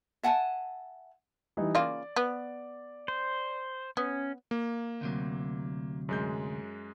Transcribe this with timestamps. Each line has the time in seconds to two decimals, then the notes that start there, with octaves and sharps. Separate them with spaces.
0.23 E5 F#5 G#5 A5
1.57 E3 G3 D#4
1.75 C#3 A#3 F4 D5
2.16 B3
3.08 C5
3.97 B3 C#4
4.51 A#3
5.01 D2 C3 F#3
6.09 F#2 G#3 G6